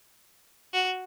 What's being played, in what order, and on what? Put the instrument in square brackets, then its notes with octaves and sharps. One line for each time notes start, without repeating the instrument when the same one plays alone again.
[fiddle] F#4